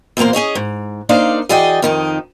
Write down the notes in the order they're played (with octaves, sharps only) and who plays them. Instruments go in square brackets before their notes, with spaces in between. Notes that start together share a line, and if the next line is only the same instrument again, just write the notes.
[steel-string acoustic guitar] E2 A#2 F#3 A#3 C5
C#4 G#4 C#5 D#5
G#2
A#3 D4 D#4 C5 D5 F5
E3 F#4 G#4 D5 D#5 G5
F2 D#3 D#4